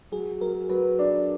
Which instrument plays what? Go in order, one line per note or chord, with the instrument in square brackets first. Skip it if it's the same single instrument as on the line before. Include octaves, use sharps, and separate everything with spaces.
[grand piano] F#3 [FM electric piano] G#4
[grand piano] F#3 [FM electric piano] A#4
[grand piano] F#3 [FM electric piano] B4
[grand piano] D4 [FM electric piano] D5